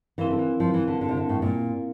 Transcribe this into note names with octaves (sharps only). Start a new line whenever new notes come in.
E3 C4 E4 A#4 F5
D3
E3
F3
E3
D3
D3
C3
D3
A2
A#2